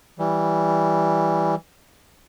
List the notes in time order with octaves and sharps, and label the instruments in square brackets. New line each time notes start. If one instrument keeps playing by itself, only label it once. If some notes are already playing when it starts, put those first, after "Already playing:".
[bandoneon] E3 G3